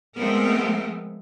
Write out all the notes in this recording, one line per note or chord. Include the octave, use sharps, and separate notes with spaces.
F3 G#3 A3 B3 C4 A#4